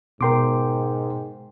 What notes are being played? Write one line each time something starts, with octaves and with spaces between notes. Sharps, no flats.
G#2 B2 A#4 G5 C6 D6